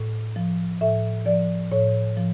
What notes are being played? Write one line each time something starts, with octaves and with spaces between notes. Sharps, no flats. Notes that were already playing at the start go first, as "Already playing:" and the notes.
Already playing: A2
F3
A2 E5
F3 D5
A2 C#5
F3